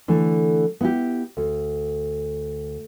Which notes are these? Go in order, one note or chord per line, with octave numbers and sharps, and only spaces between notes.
D3 E3 A3
B3 E4 G4
D2